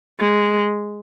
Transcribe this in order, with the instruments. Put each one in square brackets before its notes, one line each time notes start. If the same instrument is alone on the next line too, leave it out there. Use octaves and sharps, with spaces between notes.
[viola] G#3